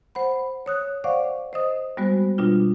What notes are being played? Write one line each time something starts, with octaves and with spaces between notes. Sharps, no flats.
C5 F#5 B5
C#5 D#6 F#6
C5 D5 F5 F#5 C#6 D6
C5 D#5 D#6
G3 G#3 B3 F#4 C5
B2 G3 D4 F4